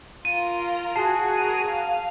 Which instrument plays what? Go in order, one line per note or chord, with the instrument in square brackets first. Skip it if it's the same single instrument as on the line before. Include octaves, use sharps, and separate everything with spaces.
[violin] F4 A#4 [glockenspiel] D#7
[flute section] F#4 G#4 [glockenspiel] A5 C7
[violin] A#4 D#7
F5